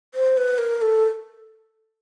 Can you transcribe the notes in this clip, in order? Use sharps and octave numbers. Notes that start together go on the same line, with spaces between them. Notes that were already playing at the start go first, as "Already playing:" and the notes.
C5
B4
A#4
A4